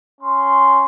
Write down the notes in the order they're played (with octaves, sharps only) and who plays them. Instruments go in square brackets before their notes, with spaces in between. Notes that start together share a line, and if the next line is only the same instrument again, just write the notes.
[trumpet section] C#4 C6